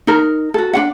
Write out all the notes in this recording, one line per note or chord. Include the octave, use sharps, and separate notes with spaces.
D#4 A#4
F#4 A4
D4 F#4 F#5